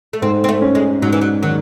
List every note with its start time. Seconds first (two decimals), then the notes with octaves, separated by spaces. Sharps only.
0.13 A3
0.22 G#2 C4
0.44 C4
0.49 A3
0.61 C#4
0.75 G#3
1.02 G#2 F#3
1.12 E3
1.21 F#3
1.42 D#3 F#3